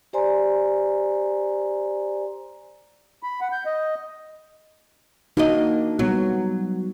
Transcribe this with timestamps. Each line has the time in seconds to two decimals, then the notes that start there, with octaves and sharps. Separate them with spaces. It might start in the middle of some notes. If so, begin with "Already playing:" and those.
0.13 G4 C5 D5 G#5 A#5 C6
3.23 B5
3.41 F#5
3.52 G6
3.66 D#5
5.37 A#3 D4 D#4 F#4 D#5
5.99 F#3 G3 B3 F#4